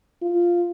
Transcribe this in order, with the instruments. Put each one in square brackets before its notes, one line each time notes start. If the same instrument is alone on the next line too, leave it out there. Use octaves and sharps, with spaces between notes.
[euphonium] F4